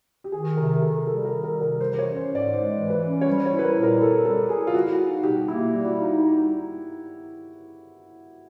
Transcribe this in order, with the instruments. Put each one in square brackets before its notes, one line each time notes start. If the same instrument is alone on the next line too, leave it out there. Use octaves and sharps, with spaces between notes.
[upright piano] G4
[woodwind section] D#3 [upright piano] G#4
[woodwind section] C3 [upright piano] A#4
[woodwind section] C3 [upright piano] A4
[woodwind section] G3 [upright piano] A4
[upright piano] A#4
[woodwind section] D#3
[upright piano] A#4
[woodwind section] C3
[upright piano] A#4
[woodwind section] E3 [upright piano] C5
[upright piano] C5
C#5
[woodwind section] C#4
[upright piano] C5
[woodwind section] G#2
[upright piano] D5
[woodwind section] G#3 [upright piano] C5
[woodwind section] E3
[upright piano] B4
[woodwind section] C#4
[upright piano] C#5
[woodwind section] G3 [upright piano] C5
[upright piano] C#5
[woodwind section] E4
[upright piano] B4
A#4
[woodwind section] A#2
[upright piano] A#4
[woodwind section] C4 [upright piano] A4
[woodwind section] G3 [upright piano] A4
[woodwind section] E4 [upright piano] G#4
[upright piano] F4
[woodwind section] G3 [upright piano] F#4
[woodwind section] D#4
[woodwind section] B2 [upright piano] G4
[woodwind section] A#3 [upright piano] E4
[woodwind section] G3
[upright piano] F#4
[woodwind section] D#4